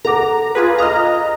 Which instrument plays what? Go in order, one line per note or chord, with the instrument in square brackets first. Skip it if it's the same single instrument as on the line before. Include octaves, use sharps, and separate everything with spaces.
[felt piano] A4 F#5 D6 [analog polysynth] A#5
[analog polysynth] F4 G#4 B4
[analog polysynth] D#5 A#5 [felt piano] F5 D#6 F6